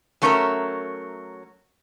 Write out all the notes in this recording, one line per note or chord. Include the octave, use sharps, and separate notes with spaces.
F#3 A3 C#4 D4 A#4 E5